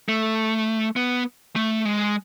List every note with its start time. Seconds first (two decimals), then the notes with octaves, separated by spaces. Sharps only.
0.09 A3
0.96 B3
1.56 A3
1.85 G#3